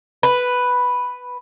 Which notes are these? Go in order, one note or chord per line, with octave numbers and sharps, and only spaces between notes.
B4